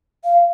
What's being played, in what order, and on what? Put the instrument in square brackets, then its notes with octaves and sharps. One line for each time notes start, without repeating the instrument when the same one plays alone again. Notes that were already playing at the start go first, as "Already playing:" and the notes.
[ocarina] F5